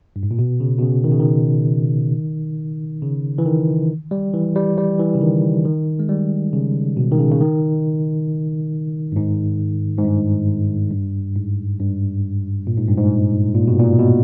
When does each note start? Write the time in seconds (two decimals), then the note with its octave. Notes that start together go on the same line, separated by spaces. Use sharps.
0.16 G2
0.23 G#2
0.31 A#2
0.39 B2
0.60 C#3
0.79 B2
0.82 C#3
1.04 D#3
1.12 C#3
1.19 D#3
3.02 C#3
3.38 E3
3.46 D#3
4.11 G3
4.34 E3
4.56 G3
4.77 G3
4.99 E3
5.15 C#3
5.21 D#3
5.65 D#3
5.99 G#3
6.09 G3
6.53 C#3
6.97 B2
7.12 D#3
7.19 C#3
7.32 C#3
7.41 D#3
9.12 G2
9.16 G#2
9.98 G#2
10.04 G2
10.91 G2
11.36 G#2
11.80 G2
12.67 A#2
12.77 G#2
12.88 G2
12.98 G#2
13.55 A#2
13.67 B2
13.80 A#2
13.99 B2